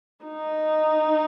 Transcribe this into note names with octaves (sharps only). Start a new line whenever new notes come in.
D#4